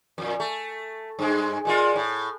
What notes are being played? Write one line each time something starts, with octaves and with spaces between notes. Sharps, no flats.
F2 A#2
A3
G2 G#3
A#2 G#3 F4
A2